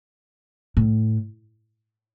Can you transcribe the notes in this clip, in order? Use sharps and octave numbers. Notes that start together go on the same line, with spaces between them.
A2